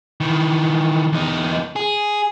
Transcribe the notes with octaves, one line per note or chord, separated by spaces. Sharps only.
D#3 E3
E2 D#4
G#4